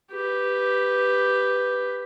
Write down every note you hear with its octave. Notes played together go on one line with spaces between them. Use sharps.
G4 B4